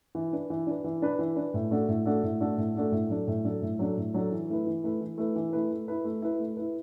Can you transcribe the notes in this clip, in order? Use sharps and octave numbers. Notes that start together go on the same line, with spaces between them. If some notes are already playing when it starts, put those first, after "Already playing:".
E3
D4 B4
E3
D4 B4
E3
D4 B4
E3
D4 B4
A2
A3 D4 F#4 A4
A2
A3 D4 F#4 A4
A2
A3 D4 F#4 A4
A2
A3 D4 F#4 A4
A2
F#3 D4 A4
A2
F#3 D4 A4
A2
F#3 D4 A4
A2
F#3 D4 A4
E3
A3 E4 B4
E3
A3 E4 B4
E3
A3 E4 B4
E3
A3 E4 B4
A3
E4 B4
A3
E4 B4
A3
E4 B4